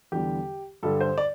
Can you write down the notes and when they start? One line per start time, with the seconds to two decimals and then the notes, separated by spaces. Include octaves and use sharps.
0.12 E2 D3 G3 G4
0.83 G2 D3 G3 A4
1.01 C5
1.18 D5